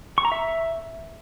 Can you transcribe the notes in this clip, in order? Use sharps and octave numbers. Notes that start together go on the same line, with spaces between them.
C#6
A#5
E5